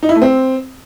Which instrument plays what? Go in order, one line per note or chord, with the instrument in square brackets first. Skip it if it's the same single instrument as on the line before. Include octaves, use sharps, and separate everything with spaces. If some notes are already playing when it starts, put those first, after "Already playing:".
[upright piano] D#4
E4
A3
C4